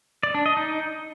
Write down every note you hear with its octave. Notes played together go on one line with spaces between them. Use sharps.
D5
D4
D#5
D#4